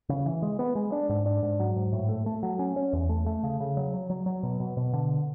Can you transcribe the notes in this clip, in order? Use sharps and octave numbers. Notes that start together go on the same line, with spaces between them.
C#3
E3
G#3
B3
G#3
D4
G#2
D4
G#2
F#3
G#2
A2
A3
A3
F#3
C#4
C#4
E2
A3
A3
C#3
C#3
F#3
F#3
F#3
F#3
B2
B2
B2
D3